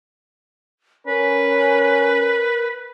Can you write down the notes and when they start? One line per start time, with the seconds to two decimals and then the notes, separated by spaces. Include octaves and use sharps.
1.07 C#4 A#4 B4